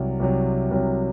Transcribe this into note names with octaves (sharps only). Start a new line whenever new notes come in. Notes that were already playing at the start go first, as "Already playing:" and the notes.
Already playing: C2 C3 F#3
C2 C3 F#3
C2 C3 F#3